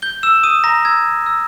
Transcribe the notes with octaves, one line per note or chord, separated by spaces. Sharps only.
G6 G7
E6 E7
D#6 D#7
A#5 A#6
E6 G#6
E6